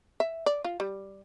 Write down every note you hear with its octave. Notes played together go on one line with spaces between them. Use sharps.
E5
D5
F4
G3